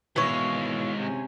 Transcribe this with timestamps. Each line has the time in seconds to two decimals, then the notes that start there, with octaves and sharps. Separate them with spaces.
0.16 B2 D#3 E3 G#3 C#5 F5
0.97 C3 C#4